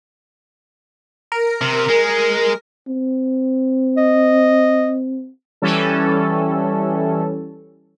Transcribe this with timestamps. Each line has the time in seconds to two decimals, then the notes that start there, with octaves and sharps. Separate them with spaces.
1.32 A#4
1.61 C3
1.89 G#3
2.88 C4
3.97 D#5
5.62 E3 G3 C#4 A4